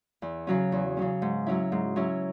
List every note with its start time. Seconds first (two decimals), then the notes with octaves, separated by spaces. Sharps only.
0.22 E2
0.47 C#3 F#3 C#4
0.72 E2
0.97 C#3 F#3 C#4
1.22 G#2
1.46 F#3 C#4 E4
1.72 G#2
1.96 F#3 C#4 E4